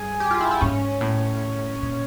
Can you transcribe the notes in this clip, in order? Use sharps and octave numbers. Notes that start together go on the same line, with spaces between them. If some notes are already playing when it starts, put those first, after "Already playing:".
Already playing: G2 G#4
G4
F4
E4
E4
G#2 C#4
A2
A#2